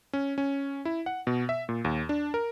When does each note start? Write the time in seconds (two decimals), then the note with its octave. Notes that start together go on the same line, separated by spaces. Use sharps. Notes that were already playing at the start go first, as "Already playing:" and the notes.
0.13 C#4
0.38 C#4
0.85 E4
1.06 F#5
1.27 B2
1.49 E5
1.69 A#2
1.85 D#2
2.09 D4
2.34 A#4